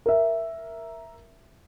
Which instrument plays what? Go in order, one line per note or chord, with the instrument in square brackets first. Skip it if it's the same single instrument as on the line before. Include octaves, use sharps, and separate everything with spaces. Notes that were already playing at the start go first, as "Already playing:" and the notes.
[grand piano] A#4 E5